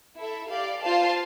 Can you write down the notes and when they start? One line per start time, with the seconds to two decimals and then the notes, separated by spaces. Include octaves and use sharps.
0.17 E4 A4 E5
0.49 G4 D5 F5
0.81 F4 C5 F5 A5